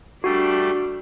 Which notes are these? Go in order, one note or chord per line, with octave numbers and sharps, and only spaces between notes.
G3 A3 D4 F#4